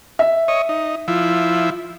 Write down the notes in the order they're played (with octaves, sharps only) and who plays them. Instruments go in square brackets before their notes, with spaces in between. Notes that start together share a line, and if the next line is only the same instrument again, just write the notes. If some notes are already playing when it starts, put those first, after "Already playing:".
[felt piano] E5
[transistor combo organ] C#5 D#5
D#4
F3 E4